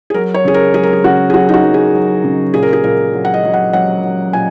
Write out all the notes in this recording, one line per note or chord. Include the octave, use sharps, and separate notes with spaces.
G#4
F#3 A#4
C#5
C#3 G#4
A#4
F#3 G#4
A#4
G#4
C#3 F#4
G#4
F#3 F#4
D#4
F#4
F#3
G#4
F#3
C#3
A#2 G#4
A#4
G#4
A#2 A#4
F#3
F#5
D#5
F#3
F#5
F#3 F#5
F#3
A#2 G#5